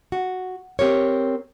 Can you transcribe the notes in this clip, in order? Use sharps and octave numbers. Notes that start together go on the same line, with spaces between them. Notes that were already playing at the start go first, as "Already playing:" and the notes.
F#4
C4 G4 A#4 C#5